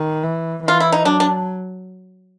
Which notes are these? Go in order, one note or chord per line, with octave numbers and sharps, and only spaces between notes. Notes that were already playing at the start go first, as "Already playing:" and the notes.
Already playing: D#3
E3
E3 F4
E4
D#4
F#3 D4
D4